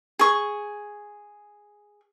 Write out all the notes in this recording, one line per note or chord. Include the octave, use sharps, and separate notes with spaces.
G#4 C#6